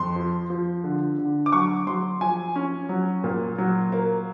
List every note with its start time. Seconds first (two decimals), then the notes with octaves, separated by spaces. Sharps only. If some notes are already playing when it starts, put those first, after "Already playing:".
Already playing: F2 C6
0.16 F3
0.50 F3
0.84 D3
1.18 D3
1.46 D6
1.52 F#3 C#6
1.87 F#3 C6
2.21 F3 G#5
2.56 C#4
2.89 F#3
3.24 A#2
3.58 F#3
3.92 A#3